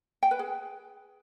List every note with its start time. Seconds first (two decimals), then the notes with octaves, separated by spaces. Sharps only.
0.23 G5
0.31 B4
0.39 G#4